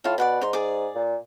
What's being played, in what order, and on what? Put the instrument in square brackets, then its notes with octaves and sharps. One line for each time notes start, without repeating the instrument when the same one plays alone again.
[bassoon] A2 [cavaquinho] F4 A4
[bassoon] B2 [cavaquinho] D5 F#5 B5
[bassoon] G#2 [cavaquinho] D#4 C6
[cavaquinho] G#4 D5 D6
[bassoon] A#2